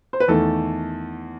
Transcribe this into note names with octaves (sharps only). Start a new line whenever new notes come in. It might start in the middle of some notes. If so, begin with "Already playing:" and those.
C5
B4
E2 D#3 A3 A4